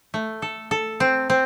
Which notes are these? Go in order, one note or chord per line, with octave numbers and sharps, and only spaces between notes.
A3
A4
A4
C4
C4